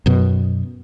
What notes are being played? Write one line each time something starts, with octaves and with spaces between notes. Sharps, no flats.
F#2 B2